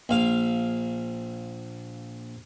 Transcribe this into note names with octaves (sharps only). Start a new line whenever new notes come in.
A#1 F5